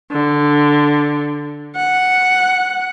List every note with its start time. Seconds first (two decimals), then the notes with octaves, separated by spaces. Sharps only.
0.11 D3
1.76 F#5